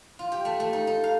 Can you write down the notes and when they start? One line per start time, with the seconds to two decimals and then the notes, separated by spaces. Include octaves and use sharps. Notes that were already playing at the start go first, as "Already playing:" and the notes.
0.19 F4
0.32 G4
0.45 A3
0.60 A3
0.73 D#4
0.87 D#4
1.04 F5